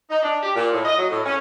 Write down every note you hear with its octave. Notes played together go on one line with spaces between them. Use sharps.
D#4
D4
G4
A#2
A2
D#5
F#3
A2
C#4